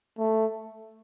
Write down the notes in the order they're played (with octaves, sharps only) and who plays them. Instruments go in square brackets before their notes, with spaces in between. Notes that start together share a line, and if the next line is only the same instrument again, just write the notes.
[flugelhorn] A3